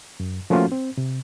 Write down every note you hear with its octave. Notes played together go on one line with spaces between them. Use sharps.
F#2
F3 A3 A#3 C#4 F4 F#4
C4
C3